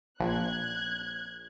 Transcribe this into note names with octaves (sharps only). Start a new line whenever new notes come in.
A#1 F#6 G#6